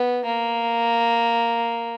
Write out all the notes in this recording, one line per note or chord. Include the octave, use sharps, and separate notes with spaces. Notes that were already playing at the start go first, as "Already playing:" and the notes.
Already playing: B3
A#3